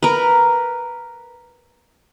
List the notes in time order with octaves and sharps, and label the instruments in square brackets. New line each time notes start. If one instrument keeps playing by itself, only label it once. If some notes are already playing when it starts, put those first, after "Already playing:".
[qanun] A#4 B4